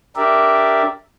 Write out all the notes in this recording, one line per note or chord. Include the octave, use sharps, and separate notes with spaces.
D4 G4 A#4 D5 E5